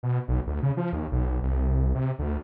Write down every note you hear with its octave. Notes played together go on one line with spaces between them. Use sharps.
B2
B1
D2
C#3
F3
D#2
B1
C2
C3
D2